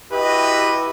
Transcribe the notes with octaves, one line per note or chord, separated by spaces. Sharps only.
E4 F#4 G4 B4 D#5